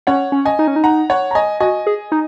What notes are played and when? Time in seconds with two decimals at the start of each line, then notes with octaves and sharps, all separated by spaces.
0.07 C#4 C#5 F#5
0.32 C#4
0.45 D#5 G#5
0.59 D#4
0.68 C#4
0.76 D#4
0.84 F#5 A#5
1.10 C#5 F#5
1.31 A#5
1.35 D#5 G#5
1.60 F#4 D#5 G#5
1.87 G#4
2.12 D#4